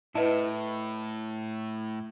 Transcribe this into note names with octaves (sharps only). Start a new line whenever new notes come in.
A2 E4 B4 D#5 A5